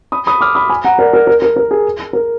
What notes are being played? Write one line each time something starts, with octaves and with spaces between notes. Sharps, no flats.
B5 D#6
B5 D#6
D6 F6
B5 D#6
G#5 B5
F#5 A#5
A#4 D5
A#4
A#4
A#4
A#4
G#4
A#4